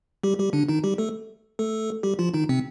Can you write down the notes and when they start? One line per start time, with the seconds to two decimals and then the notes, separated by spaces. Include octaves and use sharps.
0.23 G3 G4
0.39 G3 G4
0.53 D3 D4
0.69 D#3 D#4
0.84 G3 G4
0.98 A3 A4
1.59 A3 A4
2.03 G3 G4
2.19 F3 F4
2.34 D#3 D#4
2.49 C3 C4